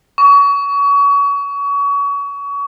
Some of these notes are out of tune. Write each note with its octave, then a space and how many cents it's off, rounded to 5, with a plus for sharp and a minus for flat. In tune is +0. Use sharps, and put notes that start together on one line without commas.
C#6 +30